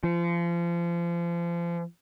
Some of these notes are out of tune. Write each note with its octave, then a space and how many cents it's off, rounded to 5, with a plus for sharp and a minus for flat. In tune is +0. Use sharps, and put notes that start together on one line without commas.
F3 -30